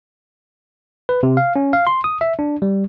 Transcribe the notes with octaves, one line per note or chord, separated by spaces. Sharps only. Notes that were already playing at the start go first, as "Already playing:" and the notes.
B4
C3
F5
C#4
F5
C6
D#6
E5
D4
G3